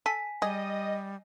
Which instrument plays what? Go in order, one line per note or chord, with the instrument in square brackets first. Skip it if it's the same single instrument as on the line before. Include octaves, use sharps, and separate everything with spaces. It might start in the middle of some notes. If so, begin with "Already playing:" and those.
[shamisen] A4 [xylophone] G#5 B6
[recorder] G3 [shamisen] G#4 [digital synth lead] D#5